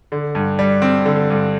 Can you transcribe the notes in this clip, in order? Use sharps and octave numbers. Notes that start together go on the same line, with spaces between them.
D3
G2
G3
C4
D3
G2